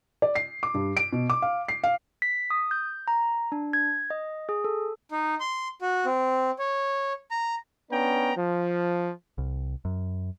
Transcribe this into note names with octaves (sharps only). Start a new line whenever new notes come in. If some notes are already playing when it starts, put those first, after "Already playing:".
D5
C7
D6
G2
D7
B2
D6
F5
C7
F5
B6
D#6
G6
A#5
D4
G#6
D#5
G#4
A4
D#4
C6
F#4
C4
C#5
A#5
B3 C#4 D4 G5 A#5
F3
C2
F#2